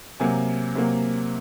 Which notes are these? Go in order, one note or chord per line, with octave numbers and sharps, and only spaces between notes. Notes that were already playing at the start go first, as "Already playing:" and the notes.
C3 F#3 A#3 G#5
C3 F#3 A#3